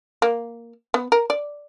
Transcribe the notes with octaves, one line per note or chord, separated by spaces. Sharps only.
A#3
B3
A#4
D5